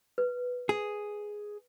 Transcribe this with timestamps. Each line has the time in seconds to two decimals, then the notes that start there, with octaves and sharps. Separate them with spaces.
0.18 B4
0.69 G#4